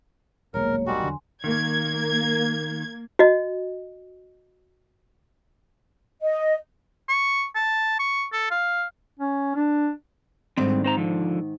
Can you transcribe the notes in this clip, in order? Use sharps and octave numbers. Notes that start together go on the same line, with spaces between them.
D#1 B1 G#3 A#3 A#4 C#5
D#3 G3 F#4 G#5 C6
E2 D3 F#3
D#3 A#3 G#6
F#4 D#5
D#5
C#6
A5
C#6
A4
F5
C#4
D4
G#2 D3 D#3 G3 C4
C4 C5 A#5
D3 F3